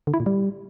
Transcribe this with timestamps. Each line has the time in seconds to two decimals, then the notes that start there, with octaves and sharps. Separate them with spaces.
0.07 D3
0.14 E4
0.20 A#2
0.26 G3